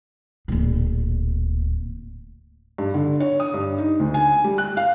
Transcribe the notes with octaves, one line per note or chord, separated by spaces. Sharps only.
D1 A#2
G2
D3
C#5
D#6
G2
D#4
D2
G#5
G3
F#6
F5